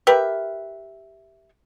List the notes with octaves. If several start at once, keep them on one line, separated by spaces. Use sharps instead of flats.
G4 A#4 B4 E5